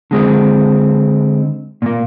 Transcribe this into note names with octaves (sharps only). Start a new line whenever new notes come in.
D3 G#3 C4
A#2 A#3